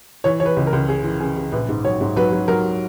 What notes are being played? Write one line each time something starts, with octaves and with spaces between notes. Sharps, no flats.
E3 C#5
E3 C#5
B4
C#2
A#4
C#2
C#3 G#4
E3
C#3 G#4
C#3
A#1 B4
G#2
F#3 C#5
G#2
F#3 B4
F#3
F#3 A#4